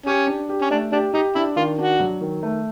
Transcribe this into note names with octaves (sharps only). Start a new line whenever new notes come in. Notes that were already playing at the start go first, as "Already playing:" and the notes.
C#4 G4
D4
G4
C#4
A3 D4
D4 G4
D#4 G4
D4 E4
D#3 F4
D4 F#4
F#3
D#3
A3